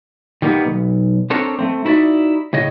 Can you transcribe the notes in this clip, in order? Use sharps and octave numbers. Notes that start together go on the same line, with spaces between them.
D#3 G3 A#3 B3
B1
C4 D4 A4 A#4 C#5
A3 A#3 C4
D#4 E4 F#4 C#5 D5 E5
A2 C#3 C#5 D#5